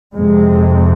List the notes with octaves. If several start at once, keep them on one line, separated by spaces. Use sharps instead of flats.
F2 C3 G#3